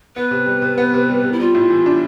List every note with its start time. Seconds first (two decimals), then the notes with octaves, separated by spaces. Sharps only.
0.16 B3 B4
0.31 C3
0.46 G3
0.62 C3
0.78 B3
0.93 C3
1.08 G3
1.24 C3
1.32 E4
1.40 G3 F4
1.55 A2
1.70 E3
1.86 D4